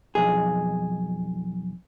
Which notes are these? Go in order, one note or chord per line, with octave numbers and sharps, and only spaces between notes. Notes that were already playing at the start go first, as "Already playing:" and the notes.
B1 F2 G#4